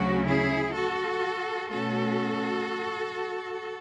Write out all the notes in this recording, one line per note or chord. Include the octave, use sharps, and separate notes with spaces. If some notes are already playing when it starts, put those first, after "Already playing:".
Already playing: D2 C#3 F#3 C#4 F#4
E4 G#4
F#4 A4
B2 A3 C#4 F#4 A4